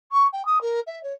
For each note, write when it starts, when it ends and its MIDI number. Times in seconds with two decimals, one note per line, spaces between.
0.12 0.27 85
0.33 0.43 79
0.45 0.61 87
0.61 0.80 70
0.87 1.01 76
1.03 1.13 73